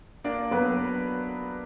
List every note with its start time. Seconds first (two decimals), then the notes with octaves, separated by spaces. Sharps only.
0.24 A#3 D4 D5
0.51 F#3 B3 B4